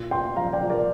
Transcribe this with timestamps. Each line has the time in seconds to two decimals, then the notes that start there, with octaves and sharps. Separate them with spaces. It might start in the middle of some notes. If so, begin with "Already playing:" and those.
Already playing: A#2
0.11 A#2 G5 C6
0.36 F3 F5 A#5
0.53 D5 G5
0.61 F3
0.70 A#4 D5